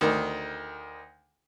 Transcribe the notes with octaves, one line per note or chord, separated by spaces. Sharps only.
D2 D#3